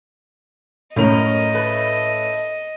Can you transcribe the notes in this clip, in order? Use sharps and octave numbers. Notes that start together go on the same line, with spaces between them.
F#2 A2 C#4 A#4 D#5 F7
A3 B4